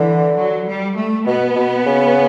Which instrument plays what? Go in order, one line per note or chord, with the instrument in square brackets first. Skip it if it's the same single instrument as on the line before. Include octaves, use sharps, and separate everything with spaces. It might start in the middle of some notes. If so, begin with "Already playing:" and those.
Already playing: [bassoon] D3 [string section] E3
[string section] F#3
G3
A3
[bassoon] B2 [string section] B3
[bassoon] B2
C#3